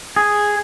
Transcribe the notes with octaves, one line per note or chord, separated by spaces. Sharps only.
G#4